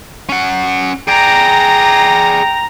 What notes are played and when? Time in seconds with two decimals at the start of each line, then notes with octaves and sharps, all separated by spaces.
0.29 C#4 F#5
1.08 G#4 D5 G5 A#5